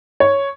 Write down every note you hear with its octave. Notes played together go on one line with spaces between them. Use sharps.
C#5